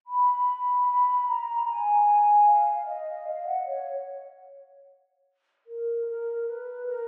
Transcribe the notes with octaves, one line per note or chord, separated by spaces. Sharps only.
B5
B5
A#5
G#5
F5
D#5
F5
F#5
C#5
A#4
A#4
B4
A#4